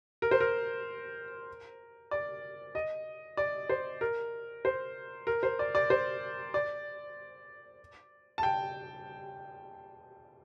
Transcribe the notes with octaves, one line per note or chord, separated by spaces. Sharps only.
A#4
C5
A#4
D5
D#5
D5
C5
A#4
C5
A#4
C5
D5
D5
C5
D5
A5
G5